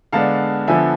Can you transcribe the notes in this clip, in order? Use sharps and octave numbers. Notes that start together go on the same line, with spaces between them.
D3 G#3 B3 D4 F5 A5
D3 F3 B3 E5 G#5